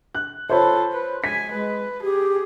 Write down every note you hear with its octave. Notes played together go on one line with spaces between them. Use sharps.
F#6
F4 A4 C5 C#5 B5
B4
G#3 G#5 B6
G#3 B4
G4 G#4